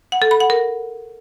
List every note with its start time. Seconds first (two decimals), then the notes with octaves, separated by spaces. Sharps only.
0.12 F#5
0.22 A4
0.31 B5
0.40 F#5
0.50 A#4